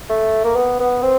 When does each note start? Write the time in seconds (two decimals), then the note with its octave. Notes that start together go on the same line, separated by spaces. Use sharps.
0.09 A3
0.44 A#3
0.56 B3
0.80 B3
1.02 C4